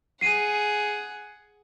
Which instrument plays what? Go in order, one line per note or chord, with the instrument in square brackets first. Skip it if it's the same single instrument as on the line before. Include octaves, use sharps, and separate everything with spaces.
[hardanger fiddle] G#4 F#5 [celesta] C7 D#7